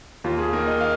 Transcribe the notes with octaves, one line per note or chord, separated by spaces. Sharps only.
D#2 F4
G#4
D#3 A#3 A#4
D#5
F5